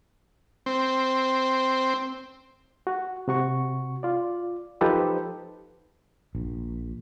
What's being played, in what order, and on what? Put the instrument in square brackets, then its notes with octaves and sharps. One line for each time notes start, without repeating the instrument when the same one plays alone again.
[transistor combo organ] C4
[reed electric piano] F#4
C3 F#4 C#6
F4 D5
F3 D#4 G4 A4 B4 C5
[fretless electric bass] A#1